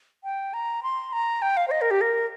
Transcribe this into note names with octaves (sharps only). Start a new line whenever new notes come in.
G5
A#5
C6
A#5
G5
F5
C5
D#5
A#4
G4
A#4